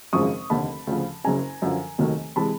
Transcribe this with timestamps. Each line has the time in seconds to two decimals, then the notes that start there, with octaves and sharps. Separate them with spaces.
0.13 G#1 F#2 C#3 F3 G#3 C#6 D#6
0.50 F1 D#2 D3 A5 B5
0.87 D2 C#3 F3
1.24 F#1 F#2 C#3 G#5 A#5
1.62 F#2 D3 F3
1.98 F1 D#2 D#3 F#3 A3
2.36 C3 E3 G#3 A5 B5